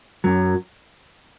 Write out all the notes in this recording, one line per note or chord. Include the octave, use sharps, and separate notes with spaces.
F#2 F#3